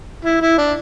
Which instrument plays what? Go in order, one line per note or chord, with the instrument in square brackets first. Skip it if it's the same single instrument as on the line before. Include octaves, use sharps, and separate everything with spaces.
[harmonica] E4
E4
D4